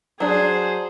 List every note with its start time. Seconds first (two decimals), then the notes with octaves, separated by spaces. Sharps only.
0.20 F#3 D4 G#4 C5